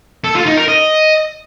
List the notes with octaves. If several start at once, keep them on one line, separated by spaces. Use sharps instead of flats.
A4
F4
D#4
A#4
D#5